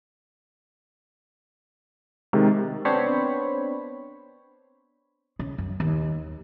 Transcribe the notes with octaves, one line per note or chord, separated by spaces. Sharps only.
C3 D#3 G#3
B3 C4 D4 C5 C#5 B5
C#3
F#2
D#2